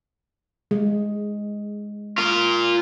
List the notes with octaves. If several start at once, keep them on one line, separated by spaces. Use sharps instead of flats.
G#3
F4 A#4